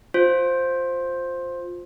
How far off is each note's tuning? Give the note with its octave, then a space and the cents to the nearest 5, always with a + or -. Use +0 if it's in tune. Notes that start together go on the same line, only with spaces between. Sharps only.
F4 +20 C5 +0